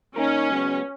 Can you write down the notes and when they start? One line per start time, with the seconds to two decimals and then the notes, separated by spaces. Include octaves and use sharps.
0.16 D#3 A#3 C#4 D#4 A#4
0.49 C#2 C#3 F#3 B3